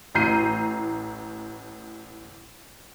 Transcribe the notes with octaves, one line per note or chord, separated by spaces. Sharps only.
A1 A2 A#5 G6 C7 D#7